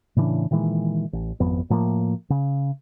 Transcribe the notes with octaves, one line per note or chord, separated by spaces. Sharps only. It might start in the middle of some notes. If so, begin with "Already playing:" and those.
A2 C#3 E3 D4
A#2 D#3 E3 G#3
A1
G#1 F2 B3
A2 F3 F#3 A#3
C#3